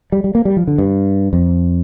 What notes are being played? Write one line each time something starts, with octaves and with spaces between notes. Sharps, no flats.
G3
G3
A#3
G3
F3
D3
G2
F2